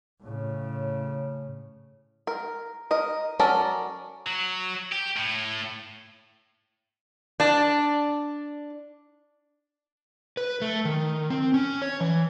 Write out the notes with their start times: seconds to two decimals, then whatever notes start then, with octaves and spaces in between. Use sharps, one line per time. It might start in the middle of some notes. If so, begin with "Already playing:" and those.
0.22 A2 C#3
2.27 A#4
2.91 A#4 D#5
3.39 F#3 C#4 A4 A#4 D5
4.27 F#3
4.92 G4
5.17 A2
7.40 D4 D5
10.37 B4
10.62 A3
10.85 D#3
11.30 C4
11.54 C#4
11.82 C#5
12.01 E3